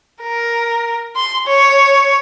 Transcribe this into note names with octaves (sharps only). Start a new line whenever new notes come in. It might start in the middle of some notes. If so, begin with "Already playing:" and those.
A#4
C6
C#5